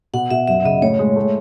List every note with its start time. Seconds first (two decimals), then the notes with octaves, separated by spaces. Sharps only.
0.13 B2 F#5
0.30 B2 E5
0.48 F#2 E5
0.65 C#3 D#5
0.82 A2 C#5
0.99 G#3
1.16 A3